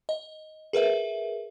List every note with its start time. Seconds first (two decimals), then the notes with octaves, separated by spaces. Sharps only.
0.09 D#5
0.73 G#4 A#4 B4 E5